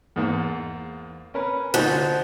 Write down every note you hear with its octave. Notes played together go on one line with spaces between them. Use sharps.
E2 G#2 A#3
C#4 A#4 B4
D2 F3 D#4 F#5